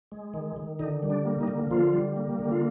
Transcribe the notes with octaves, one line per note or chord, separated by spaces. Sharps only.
G#3
D#3
D#3
D3 D#4
G3
D4
A#3
D#4
D3
D3 F3 F4
G3
A#3
D3
F4